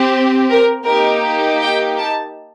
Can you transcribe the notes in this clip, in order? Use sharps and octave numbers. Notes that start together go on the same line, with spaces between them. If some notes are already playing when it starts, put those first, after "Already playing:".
Already playing: C4 G4
A#4
A#3 D#4 G4 A#4
G5
A5